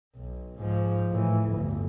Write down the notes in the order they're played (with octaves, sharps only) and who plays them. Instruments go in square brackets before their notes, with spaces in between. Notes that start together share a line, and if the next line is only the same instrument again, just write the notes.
[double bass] B1
G#2 F3
A2 E3
G1 D2